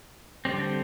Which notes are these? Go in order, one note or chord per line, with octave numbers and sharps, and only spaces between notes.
D3 G3 C4